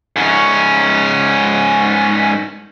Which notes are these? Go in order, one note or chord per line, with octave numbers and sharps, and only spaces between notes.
G#2 C#4